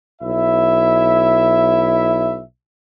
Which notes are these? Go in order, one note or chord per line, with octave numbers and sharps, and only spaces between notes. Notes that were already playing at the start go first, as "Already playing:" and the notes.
B1 E4 E5